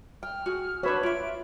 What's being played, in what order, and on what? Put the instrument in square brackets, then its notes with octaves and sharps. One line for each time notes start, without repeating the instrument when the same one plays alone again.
[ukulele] G5 [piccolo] F6
[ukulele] F#4 G#4
[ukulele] D4 F#4 [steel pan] B4 C#5 [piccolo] E5
[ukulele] F4 E5 [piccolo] D7